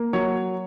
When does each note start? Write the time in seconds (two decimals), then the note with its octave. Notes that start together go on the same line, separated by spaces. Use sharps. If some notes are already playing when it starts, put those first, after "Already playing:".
Already playing: A#3
0.13 F#3 C#5